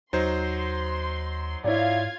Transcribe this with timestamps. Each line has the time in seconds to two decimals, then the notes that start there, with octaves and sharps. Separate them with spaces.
0.13 D#2 F#3 D#4 C5 C6
1.64 G#2 E4 F4 C#5 D5 F5 G#6